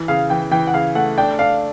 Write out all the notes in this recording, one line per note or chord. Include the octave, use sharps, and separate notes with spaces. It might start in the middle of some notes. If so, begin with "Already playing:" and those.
Already playing: E3
C#3 F5
E3 G5
E3 G5
F#5
C#3 F5
A3 F#5
D4 G5
D4 F5